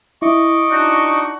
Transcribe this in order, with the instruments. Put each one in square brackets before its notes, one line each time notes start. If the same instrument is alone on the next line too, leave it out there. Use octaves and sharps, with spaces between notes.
[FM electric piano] E4 [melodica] D#5 C#6 D6
[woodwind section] D4 D#4 F#4